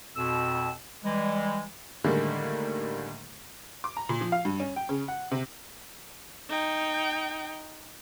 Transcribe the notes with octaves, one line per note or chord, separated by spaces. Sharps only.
F2 B2 E6
E3 G3 G#3
A2 D3 D#3 G3 G#3 A#3
D6
A#5
A#2
F3
F5
G2
C#4
G5
C#3
F#5
C3
D#4 G5